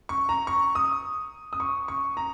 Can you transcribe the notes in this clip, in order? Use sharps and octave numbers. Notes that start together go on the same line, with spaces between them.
C#6
A#5
C#6
D#6
D#6
C#6
C#6
A#5